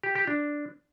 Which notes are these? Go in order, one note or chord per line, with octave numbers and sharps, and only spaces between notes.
G4
G4
D4